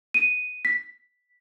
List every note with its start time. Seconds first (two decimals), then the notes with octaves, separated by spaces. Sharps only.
0.14 D#7
0.65 B6